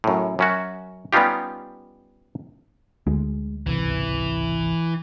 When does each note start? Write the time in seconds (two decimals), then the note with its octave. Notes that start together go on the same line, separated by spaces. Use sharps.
0.04 F#2 A2
0.39 F#2 C#4 F#4
1.13 G3 B3 C#4 D#4 F4 G4
3.07 D2 G#3
3.67 G#1 C#2 C3 E3